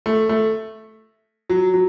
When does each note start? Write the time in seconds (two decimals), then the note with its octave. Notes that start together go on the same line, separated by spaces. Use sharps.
0.06 A3
0.29 A3
1.50 F#3
1.74 F#3